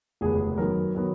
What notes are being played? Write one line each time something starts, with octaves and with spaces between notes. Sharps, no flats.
F1 D#2 C#3 G#3 B3 G#4
F#2 D#3 F#3 B3 A#4
D#3 F#3 B3